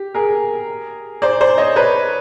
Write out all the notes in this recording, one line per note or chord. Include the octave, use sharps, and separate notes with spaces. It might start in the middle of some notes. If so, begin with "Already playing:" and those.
Already playing: G4
G#4 A#4
C5 D5
C5 D5
C#5 D#5
B4 C#5